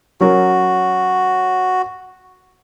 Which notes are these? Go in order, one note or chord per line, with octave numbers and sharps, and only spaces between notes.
F#3 C#4 F#4 A#4